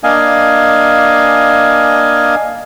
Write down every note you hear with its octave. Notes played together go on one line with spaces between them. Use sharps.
A#3 D4 D#5 F5 G#5